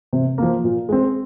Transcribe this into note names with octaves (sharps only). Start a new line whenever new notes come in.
C3
F3 A#3
A#2
G#3 C4